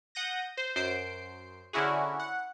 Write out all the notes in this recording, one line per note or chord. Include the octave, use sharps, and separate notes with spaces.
F#5 D#6 G6 A#6
C5
F#2 C5 C7 D7
D3 C#4 E4 F#4 G#4
F#5